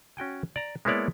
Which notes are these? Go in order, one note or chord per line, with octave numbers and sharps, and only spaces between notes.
C#4 F#4 G5 G#5
D5 A#5
G#3 A#3 B3 E4 C#5 D5